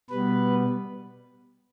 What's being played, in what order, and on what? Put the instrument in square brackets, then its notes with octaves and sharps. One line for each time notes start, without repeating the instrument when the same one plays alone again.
[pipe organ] B2 G3 B3 B4